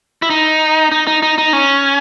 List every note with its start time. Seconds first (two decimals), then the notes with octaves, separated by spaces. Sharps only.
0.22 E4
0.30 D#4
0.92 D#4
1.07 D#4
1.22 D#4
1.38 D#4
1.53 C#4